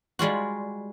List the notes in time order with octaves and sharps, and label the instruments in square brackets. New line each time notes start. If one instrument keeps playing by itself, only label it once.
[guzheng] G3 G#3 F4 F#4